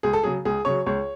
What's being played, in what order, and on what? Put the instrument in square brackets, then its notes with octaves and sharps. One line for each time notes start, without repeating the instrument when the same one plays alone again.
[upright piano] C#2 G#4
A4
C#3 F#3 G#4
C#2 G#4
C#3 F#3 C#5
C#2 C#5